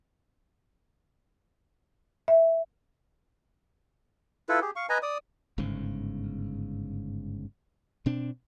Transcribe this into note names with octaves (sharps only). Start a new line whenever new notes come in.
E5
E4 F4 A4 B4
G4 G#4
F5 C#6
B4 D#5 G#5 A#5
D5 D#6
G1 G#2 C#3
B2 C4 D4